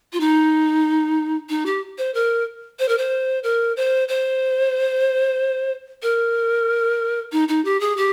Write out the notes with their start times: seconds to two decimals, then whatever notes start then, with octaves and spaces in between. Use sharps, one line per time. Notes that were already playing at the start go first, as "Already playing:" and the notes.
0.13 F4
0.20 D#4
1.49 D#4
1.66 G4
1.98 C5
2.14 A#4
2.79 C5
2.89 A#4
2.98 C5
3.43 A#4
3.77 C5
4.08 C5
6.02 A#4
7.32 D#4
7.48 D#4
7.65 G4
7.80 G#4
7.97 G4